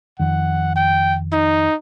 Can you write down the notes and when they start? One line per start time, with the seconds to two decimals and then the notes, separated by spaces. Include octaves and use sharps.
0.20 F2 D#3 F#5
0.76 G5
1.32 D#4